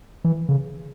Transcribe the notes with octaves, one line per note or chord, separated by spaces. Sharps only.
E3
C#3